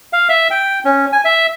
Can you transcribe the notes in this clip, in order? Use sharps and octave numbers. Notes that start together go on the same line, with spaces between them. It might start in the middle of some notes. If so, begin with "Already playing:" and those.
F5
E5
G5
C#4
G#5
E5